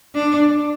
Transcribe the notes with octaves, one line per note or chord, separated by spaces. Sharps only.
D4